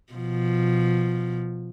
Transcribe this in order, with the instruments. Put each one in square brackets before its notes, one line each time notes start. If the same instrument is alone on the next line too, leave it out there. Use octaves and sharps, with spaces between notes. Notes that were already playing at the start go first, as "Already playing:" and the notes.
[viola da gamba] B2 F3